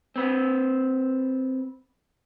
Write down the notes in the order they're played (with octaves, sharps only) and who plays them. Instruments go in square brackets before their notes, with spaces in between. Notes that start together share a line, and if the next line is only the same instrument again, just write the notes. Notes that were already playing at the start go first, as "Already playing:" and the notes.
[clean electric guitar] C4 B4